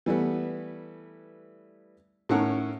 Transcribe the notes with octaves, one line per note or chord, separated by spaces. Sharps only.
E3 G3 A3 B3
A2 D#3 C#4 A4 A#4 F#5